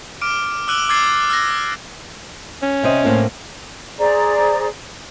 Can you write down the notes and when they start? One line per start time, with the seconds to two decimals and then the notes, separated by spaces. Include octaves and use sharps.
0.21 D6 F6 D7 D#7
0.68 D6 E6 F#6 D#7 F#7 G7
0.89 D6 E6 G#6 A6 C7 D#7
1.29 E6 F#6 A#6
2.62 C#4
2.83 C3 C4 D#5
3.05 A2 A#3 C4
3.98 G#4 C5 D5 A#5